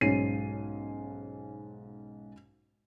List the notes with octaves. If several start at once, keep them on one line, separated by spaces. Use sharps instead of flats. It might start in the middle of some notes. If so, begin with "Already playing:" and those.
B1 G#2 C#4 C7 D#7